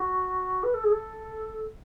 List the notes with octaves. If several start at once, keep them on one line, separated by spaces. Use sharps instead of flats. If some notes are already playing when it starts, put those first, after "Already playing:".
Already playing: F#4
B4
A4
G#4
A4